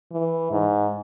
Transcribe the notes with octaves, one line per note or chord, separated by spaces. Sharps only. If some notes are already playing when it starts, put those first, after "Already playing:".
E3
G#2